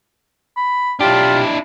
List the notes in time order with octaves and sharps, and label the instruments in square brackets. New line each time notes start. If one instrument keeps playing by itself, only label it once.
[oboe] B5
[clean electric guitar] B1 G4 [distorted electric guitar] D4 E4 [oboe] F4